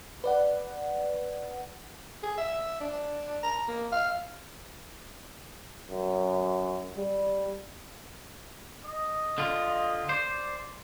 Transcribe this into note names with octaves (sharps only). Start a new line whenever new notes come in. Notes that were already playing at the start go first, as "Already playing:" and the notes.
B4 D5 F#5
G#4
E5
D4
A#5
A#3
F5
F#2
G3
D#5
D3 F4
C5 D5